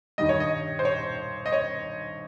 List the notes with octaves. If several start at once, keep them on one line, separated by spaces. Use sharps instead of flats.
G2 D#3 G3 D#5
C#5
D#5
C5
C#5
D#5
C#5